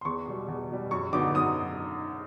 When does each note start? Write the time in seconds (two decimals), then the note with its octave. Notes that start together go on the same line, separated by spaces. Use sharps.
0.01 C6
0.05 E2 C#6
0.27 B2 G3
0.48 E2
0.70 B2 G3
0.91 F#2 C#6
1.13 D3 F#3 B3 D#4 D6
1.34 F#2 D#6